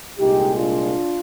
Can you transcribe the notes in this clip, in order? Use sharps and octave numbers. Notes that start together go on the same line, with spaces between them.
C2 A#2 G#3 D#4 G4
D4 F4